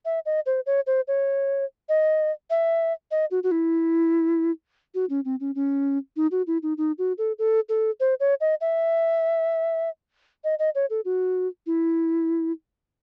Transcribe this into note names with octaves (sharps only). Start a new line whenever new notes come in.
E5
D#5
C5
C#5
C5
C#5
D#5
E5
D#5
F#4
F#4
E4
F#4
C#4
C4
C#4
C#4
D#4
F#4
E4
D#4
D#4
F#4
A4
A4
A4
C5
C#5
D#5
E5
D#5
D#5
C#5
A4
F#4
E4